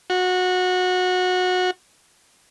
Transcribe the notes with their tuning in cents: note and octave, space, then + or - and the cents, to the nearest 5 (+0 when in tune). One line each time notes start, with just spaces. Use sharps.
F#4 -20